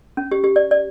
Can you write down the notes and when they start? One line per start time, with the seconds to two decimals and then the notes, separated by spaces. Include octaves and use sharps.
0.17 C#4
0.32 G4
0.44 G4
0.56 D5
0.71 D5